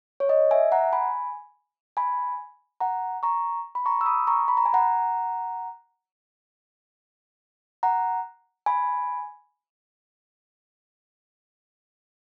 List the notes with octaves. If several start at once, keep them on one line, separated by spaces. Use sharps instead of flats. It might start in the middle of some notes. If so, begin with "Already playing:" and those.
C#5
D#5
E5 G#5
F#5 A#5
G#5 B5
G#5 B5
F#5 A#5
A#5 C#6
B5
A#5 C#6
E6
B5 D#6
A#5 C#6
B5
A#5
G#5
F#5 A#5
F#5 A#5
G#5 B5